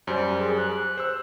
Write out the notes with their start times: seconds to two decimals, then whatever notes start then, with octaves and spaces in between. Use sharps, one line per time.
0.07 F#2 G3 C5
0.40 G#4
0.58 F#6
0.97 C5 E6